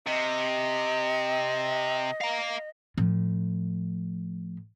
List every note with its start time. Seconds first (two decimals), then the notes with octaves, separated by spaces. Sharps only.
0.07 C3 D#5
2.21 F5 A#5
2.98 A2 F3